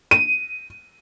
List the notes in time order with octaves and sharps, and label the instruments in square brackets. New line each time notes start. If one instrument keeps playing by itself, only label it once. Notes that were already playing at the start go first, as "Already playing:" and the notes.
[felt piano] D#7